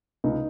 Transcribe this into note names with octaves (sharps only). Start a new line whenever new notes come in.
C#2 D#4